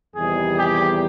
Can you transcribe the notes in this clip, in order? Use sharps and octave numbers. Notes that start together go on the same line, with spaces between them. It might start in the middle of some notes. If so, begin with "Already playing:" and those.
E2 C3 D#3 G3 G#4
G4